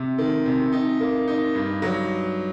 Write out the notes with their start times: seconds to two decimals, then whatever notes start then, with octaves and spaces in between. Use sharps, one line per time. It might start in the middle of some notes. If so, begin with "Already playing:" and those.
Already playing: C3
0.18 D#3
0.45 C3
0.72 D#4
1.00 A#3
1.28 D#4
1.55 G2
1.82 F#3